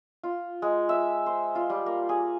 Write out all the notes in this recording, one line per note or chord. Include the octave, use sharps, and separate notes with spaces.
F4
G#3
E5
C5
F4
G3
A#3
G#4